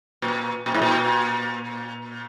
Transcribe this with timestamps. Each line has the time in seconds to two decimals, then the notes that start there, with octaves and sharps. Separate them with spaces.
0.22 A#2
0.66 A#2
0.74 G#2
0.82 A#2